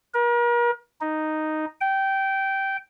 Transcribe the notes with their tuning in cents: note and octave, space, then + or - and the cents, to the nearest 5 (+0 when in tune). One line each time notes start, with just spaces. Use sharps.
A#4 +40
D#4 -5
G5 -15